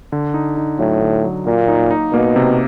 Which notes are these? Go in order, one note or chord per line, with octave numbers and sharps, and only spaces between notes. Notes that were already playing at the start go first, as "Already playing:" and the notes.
D3
D#4
D#4
A2 F#3
D3
F#3
A#2 A#3
D#4
D#4
B2 A#3
C3